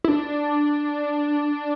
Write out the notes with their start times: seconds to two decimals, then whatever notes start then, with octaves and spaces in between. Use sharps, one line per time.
0.04 E4
0.08 D4